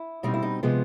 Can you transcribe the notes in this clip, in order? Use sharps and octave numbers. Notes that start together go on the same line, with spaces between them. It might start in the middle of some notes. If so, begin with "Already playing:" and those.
Already playing: E4
B2 G3 C4 D#4
E4
D#4
C3 F3 G#3 B3